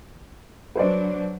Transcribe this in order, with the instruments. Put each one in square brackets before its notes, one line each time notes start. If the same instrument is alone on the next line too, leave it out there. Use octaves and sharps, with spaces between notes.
[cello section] F#3 D4 [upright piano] B4 C5 D5